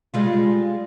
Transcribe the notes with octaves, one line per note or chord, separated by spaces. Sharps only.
G3 G#3 F4